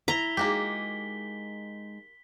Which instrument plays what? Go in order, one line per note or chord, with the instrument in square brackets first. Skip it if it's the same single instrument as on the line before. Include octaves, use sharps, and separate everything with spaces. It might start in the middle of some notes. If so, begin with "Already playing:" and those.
[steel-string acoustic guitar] E4 [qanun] A#5 [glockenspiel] B6 G7
[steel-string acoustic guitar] G#3 D#4 [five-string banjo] A#3 F#4 G4 [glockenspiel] B6